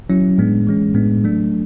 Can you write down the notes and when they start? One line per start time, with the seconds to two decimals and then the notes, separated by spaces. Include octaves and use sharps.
0.10 F#3 C#4 E4
0.38 A2 G#3 B3 D4
0.67 E3 G#3 C#4
0.95 A2 G#3 B3 D4
1.24 F#3 A3 D4